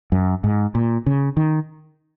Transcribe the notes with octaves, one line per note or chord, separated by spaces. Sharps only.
F#2
G#2
A#2
C#3
D#3